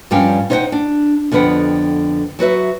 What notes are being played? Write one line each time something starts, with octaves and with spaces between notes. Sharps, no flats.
G2 F3 G3 C#4 F5 G5
D#4 C5 C#5 E5 F#5 G5
D4
F2 D3 B3 B4 F#5 G5
F#3 F#4 B4 E5